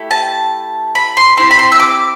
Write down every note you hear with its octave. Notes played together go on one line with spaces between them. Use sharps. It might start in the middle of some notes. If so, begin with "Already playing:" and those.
Already playing: A3 E4 G4
A5
B5
C6
C4 E4 G4 C6
B5
C6
E6
D6